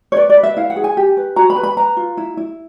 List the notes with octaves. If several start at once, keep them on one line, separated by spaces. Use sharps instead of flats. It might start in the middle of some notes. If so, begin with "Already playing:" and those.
C#5
B4 D5
D5
B4
E5
E4 F5
F#5
G#4
G#5
G4
B4
F#4 A#5
B5
B4
B5
B4 A#5
F4
E4
E4